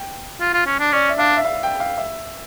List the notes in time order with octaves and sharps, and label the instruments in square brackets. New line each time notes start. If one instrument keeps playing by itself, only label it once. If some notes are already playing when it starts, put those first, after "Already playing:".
Already playing: [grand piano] G5
[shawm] F4
F4
C#4
D4
[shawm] C#4 [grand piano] D5
[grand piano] E5
[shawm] D4 [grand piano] F5
[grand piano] E5
F5
G5
F5
E5